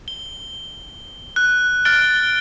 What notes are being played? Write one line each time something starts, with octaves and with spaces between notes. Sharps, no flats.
G7
F#6
F6 F#6 A6 D7 G7